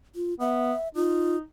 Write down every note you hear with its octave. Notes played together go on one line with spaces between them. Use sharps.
F4
B3 E5
D#4 F4